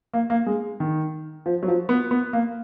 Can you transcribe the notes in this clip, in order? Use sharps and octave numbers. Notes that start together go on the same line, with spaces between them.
A#3
A#3
G#3
D#3
F3
F#3
F3
B3
B3
A#3